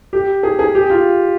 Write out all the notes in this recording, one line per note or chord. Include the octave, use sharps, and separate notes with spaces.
G4
G#4
G#4
G4
F4